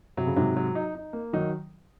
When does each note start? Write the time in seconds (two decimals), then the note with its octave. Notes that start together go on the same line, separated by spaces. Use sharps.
0.17 C3 F#3
0.27 C#3
0.36 G#2 C3 F#3
0.56 F#3
0.75 D#4
0.95 D#4
1.13 A#3
1.33 D#3 F#3 D#4